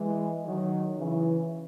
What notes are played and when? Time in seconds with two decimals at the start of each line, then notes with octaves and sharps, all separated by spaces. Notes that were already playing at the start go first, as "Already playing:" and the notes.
Already playing: E3 G#3
0.45 D#3 F#3
0.98 C#3 E3